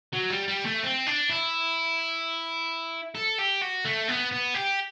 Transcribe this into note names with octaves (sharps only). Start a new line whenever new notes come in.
F#3
G3
G3
A3
C4
D4
E4
A4
G4
F#4
A3
B3
B3
G4